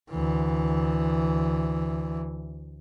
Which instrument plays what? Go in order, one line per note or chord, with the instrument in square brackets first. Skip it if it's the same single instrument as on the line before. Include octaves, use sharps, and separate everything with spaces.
[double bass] D2 E3